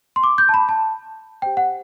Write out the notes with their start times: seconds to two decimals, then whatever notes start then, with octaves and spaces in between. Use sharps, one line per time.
0.16 C6
0.24 D6
0.38 G6
0.49 A5
0.54 B5
0.69 A5
1.42 G4 C5 G5
1.57 F#5